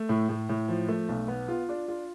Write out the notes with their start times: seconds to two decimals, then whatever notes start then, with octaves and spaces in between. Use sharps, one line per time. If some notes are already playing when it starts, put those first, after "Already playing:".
Already playing: A3
0.09 A2
0.29 A2
0.49 A2
0.68 F3
0.88 A3
1.09 B1
1.28 B3
1.48 F4
1.69 D4
1.88 F4